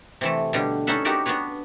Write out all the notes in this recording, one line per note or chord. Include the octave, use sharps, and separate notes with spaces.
C3 E3 A3
B2 D3 G3
C#4 D#4 A4 B4 E5 F#5
D#4 F#4 G4 A#4 D5 E5
B3 D4 F#4 B4 C#5